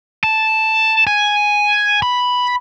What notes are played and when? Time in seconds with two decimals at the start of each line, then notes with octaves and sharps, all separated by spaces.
0.24 A5
1.07 G#5
2.02 B5